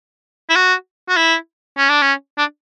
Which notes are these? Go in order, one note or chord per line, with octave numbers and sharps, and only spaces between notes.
E4
F#4
F#4
E4
C#4
D4
C#4
D4